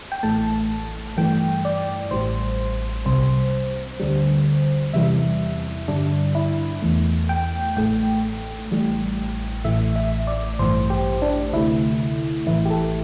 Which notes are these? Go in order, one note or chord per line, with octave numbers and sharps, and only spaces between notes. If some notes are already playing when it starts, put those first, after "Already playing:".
G5
A1 A2 A3 A5
G2 E3 A3 G5
D5
A1 A2 G3 C5
C2 C3 G3 C5
D2 D3 G3
E2 C3 E3 G3 E5
G2 D3 G3 D4
E4
E2 E3 A3
G5
A1 A2 A3 G5
A1 A2 G3
A1 A2 E3 A3 E5
E5
D5
A1 G2 E3 A3 C5
G4
D4
D2 C3 A3 E4
A1 A2 E3 E4
G4
A4